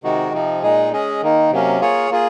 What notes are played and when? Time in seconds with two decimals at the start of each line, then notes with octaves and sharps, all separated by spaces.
0.03 C3 D#3 G#3 D#4 F#4
0.33 C3 F3 C4 D#4
0.62 A#2 G#3 D#4 G#4
0.92 G#3 C#4 G#4 D#5
1.22 D#3 A#3 D#4
1.51 C3 F#3 A#3 C#4
1.81 A#3 F4 G#4 C#5
2.10 A#3 F4 G#4